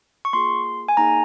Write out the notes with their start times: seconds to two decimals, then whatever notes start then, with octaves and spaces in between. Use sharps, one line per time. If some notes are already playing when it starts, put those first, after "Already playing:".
0.25 C#6
0.33 A#3 F4 G#4 C6
0.89 G#5
0.97 A#3 D#4 G#4 A#5